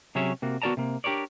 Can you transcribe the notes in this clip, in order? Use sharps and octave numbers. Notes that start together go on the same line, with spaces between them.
C3 F#3 C#4 G#4 C#5 E5
C3 A#3 F#4
B3 F#4 A#4 D5 A5 A#5
C3 A#3
D4 G4 A#4 C#5 D5